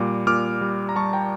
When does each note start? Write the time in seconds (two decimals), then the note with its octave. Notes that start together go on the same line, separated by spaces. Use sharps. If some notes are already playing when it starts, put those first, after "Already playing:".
Already playing: A#2 G3 D6
0.27 A#2 D6 F6
0.61 G3
0.89 A#5
0.96 G3 A5 C#6
1.13 G5 A#5